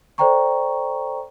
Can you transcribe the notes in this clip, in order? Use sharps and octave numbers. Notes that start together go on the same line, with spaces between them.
A4 C5 D5 G5 A#5 C#6